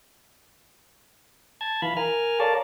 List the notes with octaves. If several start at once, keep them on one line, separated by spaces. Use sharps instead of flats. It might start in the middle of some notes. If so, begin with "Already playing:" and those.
A5 G#6
E3 F5 B5
A#4 G#5 F6
A4 A#4 C#5 D5 F5 A5